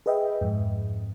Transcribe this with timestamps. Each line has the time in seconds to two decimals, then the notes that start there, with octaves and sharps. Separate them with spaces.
0.06 G#4 B4 D#5 E5 G5
0.41 F2 G#2